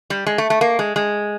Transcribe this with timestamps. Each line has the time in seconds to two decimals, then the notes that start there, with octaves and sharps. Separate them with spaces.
0.10 G3
0.26 G#3
0.38 A3
0.50 A3
0.61 A#3
0.79 G#3
0.96 G#3